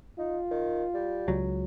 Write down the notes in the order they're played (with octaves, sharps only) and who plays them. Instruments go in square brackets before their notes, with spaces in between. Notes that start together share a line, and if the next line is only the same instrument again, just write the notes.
[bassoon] D#4 [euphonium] F4
[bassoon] D#3
G3
[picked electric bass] C#2 F#3